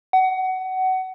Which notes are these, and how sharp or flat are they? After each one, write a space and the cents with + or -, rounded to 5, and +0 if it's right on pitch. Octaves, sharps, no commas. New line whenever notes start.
F#5 +25